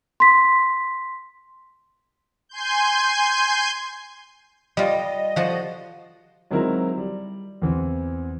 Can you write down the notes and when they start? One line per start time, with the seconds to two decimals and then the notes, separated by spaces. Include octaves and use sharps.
0.20 C6 B6
2.49 G#5 C6 G6
4.77 G3 F4 D#5
5.36 F3 F#4 A5
6.51 D#3 F#3 G#3 C4 E4 A#4
6.98 G3
7.62 E2 E3 C4